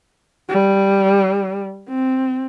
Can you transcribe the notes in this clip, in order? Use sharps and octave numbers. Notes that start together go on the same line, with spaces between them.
G3
C4